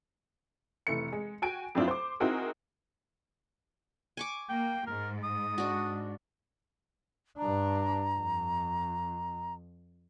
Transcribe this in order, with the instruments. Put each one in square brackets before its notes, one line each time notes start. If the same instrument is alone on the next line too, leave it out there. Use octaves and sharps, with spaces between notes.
[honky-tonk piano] F1 E3 A3 C#7
G#3
F#4 G5 G#5 D7
F2 F#3 C4 D4 E4 F4
C5 D6
C4 D#4 E4 F#4 G#4 A#4
[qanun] G#5 C#6 D6
[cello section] A#3 [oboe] G5
[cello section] G#2 [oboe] A#4
[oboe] D#6
[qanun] D4 F#4
[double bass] G2 D4 [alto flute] A#5
[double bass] F2